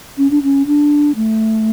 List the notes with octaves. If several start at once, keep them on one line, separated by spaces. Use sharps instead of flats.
C#4
D4
C#4
D4
A3